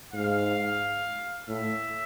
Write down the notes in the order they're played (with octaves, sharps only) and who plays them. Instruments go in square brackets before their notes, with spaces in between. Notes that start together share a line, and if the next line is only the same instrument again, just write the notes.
[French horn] G#2 [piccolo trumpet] F5
[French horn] A2 [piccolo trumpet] E5